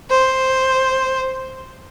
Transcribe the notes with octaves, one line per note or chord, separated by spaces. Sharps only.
C5